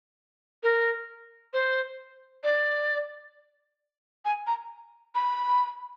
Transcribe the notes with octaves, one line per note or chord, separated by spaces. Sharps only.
A#4
C5
D5
G#5
A#5
B5